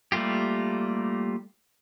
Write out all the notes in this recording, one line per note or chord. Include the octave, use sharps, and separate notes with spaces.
G3 A3 A#3 F4 G4